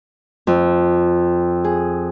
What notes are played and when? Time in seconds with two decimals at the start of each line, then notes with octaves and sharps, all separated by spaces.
0.47 F2
1.65 G#4